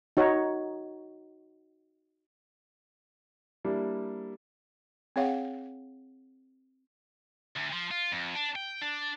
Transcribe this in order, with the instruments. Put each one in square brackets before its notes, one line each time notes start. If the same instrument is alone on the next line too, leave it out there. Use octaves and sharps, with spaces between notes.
[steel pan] D#4 F#4 C#5
[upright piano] G3 A#3 D4 E4 G4
[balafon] C4 G#4 C#5 F5 F#5
[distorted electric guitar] D2
F3
F4
F2
D4
G5
D4